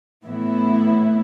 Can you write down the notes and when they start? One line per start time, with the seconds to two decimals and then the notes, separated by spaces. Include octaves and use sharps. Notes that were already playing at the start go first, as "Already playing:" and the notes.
0.25 A2 E3 B3 E4